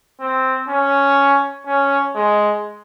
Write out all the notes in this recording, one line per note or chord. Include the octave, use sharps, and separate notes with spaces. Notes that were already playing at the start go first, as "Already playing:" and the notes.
C4
C#4
C#4
G#3